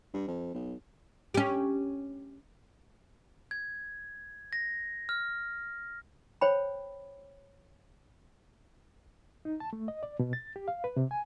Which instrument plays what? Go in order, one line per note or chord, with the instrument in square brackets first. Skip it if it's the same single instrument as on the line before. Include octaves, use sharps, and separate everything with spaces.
[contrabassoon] G2
F2
B1
[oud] C#4 G4
[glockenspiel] G#6
A#6
F6
[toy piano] C5 C#5 G5 B5
[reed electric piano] D#4
A5
A3
D#5
D5
B2
A6
G4
F5
B4
C3
G#5